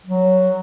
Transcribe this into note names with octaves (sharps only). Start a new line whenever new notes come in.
F#3